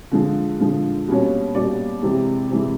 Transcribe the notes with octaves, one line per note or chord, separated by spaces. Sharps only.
D3 F3 G#3
D3 F3 G#3
B2 G3 A#3 C#4
B2 G3 A#3 C#4 D5
C3 E3 G#3
C3 E3 G#3